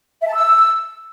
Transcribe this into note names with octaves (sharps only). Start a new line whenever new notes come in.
E5
A5
E6